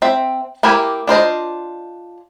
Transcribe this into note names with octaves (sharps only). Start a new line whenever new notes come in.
C4 E5
A#3 E4 G4 A#4 G#5
D4 F4 C5 D#5